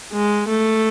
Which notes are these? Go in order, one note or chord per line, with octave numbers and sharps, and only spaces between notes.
G#3
A3